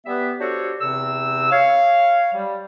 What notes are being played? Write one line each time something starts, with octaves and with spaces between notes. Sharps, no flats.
G3 B3 G4 B4 E5
D4 F#4 G4 A4 C5 C#5
E2 C3 C4 E6
C#5 F5
G3